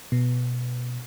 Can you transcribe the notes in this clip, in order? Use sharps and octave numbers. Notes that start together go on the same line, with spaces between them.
B2